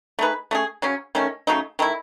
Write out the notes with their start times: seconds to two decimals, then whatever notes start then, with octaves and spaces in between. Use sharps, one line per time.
0.19 A3 D#4 G#4 B4
0.51 A3 C#4 G#4
0.82 C#3 F#3 C#4
1.15 D#3 A3 C#4
1.47 C#3 F#3 A3 D#4
1.79 D#3 A3 E4